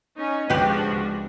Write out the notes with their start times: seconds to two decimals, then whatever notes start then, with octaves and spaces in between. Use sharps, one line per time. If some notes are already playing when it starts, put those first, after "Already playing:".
0.17 C#4 D#4 C#5
0.50 C#2 F3 G#3 C4 D4 F#4 G4 B4